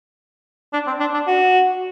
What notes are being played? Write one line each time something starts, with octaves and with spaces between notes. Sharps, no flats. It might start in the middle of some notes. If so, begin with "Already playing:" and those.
D4
C4
D4
D4
F#4